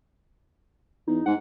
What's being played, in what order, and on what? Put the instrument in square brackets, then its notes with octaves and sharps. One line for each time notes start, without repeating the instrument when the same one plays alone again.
[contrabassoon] E2 [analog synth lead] D#4
[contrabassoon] G#2 [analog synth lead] F#5